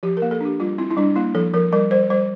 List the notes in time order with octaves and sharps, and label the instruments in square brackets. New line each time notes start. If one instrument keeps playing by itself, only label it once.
[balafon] F3 G4
A#4
A#3
A4
D4 G4
G3 F4
C4 E4
E4
G3 D4
A#3 E4
F3 A4
F3 A#4
G3 A#4
G3 C5
G3 C5